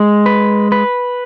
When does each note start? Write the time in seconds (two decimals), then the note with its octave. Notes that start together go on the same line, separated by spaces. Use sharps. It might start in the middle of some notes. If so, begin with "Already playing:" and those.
Already playing: G#3
0.26 B4
0.72 B4